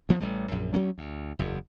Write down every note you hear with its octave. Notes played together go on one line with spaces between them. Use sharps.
D2 F3 B3
A1 G3 A3
A#1 F#2
D2 F#3 A#3 C#4
D2
F#1 E2